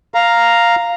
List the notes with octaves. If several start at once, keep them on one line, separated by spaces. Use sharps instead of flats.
F5 A#5